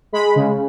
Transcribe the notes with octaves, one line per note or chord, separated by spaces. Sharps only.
G#3 B5
C#3